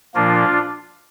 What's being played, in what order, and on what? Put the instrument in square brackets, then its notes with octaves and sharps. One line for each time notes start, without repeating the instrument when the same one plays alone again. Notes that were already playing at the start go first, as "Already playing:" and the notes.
[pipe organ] A#2 F3 A#3 D4 F4